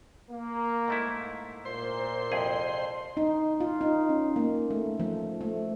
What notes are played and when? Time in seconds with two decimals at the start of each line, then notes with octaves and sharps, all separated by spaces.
0.31 A#3
0.88 G#2 A3 E4
1.65 A#2 C5 C6
2.31 C2 F2 G#4
3.17 D#4
3.60 F4
3.81 D#4
4.09 C#4
4.36 A#3
4.71 A3
5.00 F3
5.41 A3